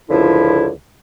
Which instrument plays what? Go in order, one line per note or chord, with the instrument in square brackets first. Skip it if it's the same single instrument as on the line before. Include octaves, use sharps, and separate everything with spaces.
[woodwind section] C#2 F#2 D3 F3 E4